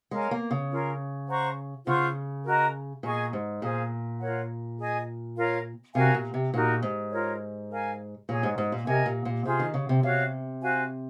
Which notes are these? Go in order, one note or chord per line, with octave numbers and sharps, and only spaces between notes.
G#3 A#4 C#5 F5 G#5
A#3
C#3
C#4 F4 A#4
C5 F#5 A#5 C#6
C#3 F4 C5 F#5 C#6
F#4 A#4 D#5 A#5
A#2 G#4 D#5 G#5 C#6
G#2
A#2 G#4 C5 F5
F4 A#4 C#5 F#5
G#4 D#5 G#5
F4 A#4 C#5 F5
C3 F#4 A#4 F5 G#5
A#2
C3
A#2 D#4 F#4 A#4
G#2
F4 A#4 C#5
A#4 F5 G#5
A#2 G#4 C#5 G#5 C#6
G#2
G#2
A#2
C3 A#4 D#5 G#5
A#2
A#2
C3 F4 G#4 C5
D#3
C#3
C3
C3 F#4 C#5 F5
F#4 C5 F5 G#5